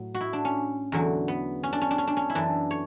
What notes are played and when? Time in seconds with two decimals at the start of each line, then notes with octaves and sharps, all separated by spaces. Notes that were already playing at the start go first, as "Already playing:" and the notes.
Already playing: A2 F#3
0.14 F#4
0.21 E4
0.33 D4
0.45 C#4
0.92 E2 D3 F#3
1.28 B3
1.63 C#4
1.73 D4
1.81 C#4
1.91 D4
1.98 C#4
2.07 D4
2.17 C#4
2.30 E4
2.35 F#2 E3 D4
2.71 C#5